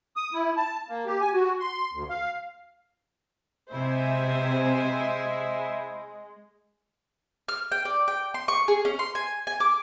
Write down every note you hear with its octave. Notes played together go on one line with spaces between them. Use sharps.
D#6
E4
A5
A#3
G4
G#5
F#4
C6
D2
F5
C3 G#3 E4 C5 E5 G#5
F6
G5
D5
G5
C6
C#6
G#4
C#4
C6
G#5
G#5
D6